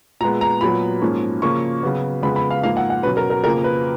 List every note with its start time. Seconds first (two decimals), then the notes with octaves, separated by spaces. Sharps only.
0.21 A#2 G#3 B3 A#5
0.41 A#5
0.61 A#2 F#3 B3 B5
1.01 G#2 F3 A#3 C#4
1.42 C#3 F3 A#3 C#4 C#6
1.83 C#3 F#3 B3
2.23 F2 C#3 G#3 B3 B5
2.36 B5
2.51 F5
2.63 G#2 F3 A#3 F5
2.77 F#5
2.90 F#5
3.03 B2 F#3 C#4 B4
3.17 A#4
3.30 A#4
3.44 F2 C#3 F3 A#3 A#4
3.64 B4